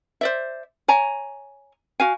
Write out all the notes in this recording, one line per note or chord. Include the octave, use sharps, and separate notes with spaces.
C5 D5 E5
C#5 G#5 A#5
F#4 F5 G#5